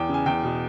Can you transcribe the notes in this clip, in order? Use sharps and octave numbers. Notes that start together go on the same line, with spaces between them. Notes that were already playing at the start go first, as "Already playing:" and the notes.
Already playing: E2 G5
C#3
G#5
E2 G5
B2